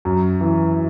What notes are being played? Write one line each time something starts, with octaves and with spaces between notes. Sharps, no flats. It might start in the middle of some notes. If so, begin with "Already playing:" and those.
F#2
E3